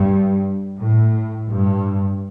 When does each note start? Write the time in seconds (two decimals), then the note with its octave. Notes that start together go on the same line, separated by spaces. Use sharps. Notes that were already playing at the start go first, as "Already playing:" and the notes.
Already playing: G2
0.77 A2
1.48 G2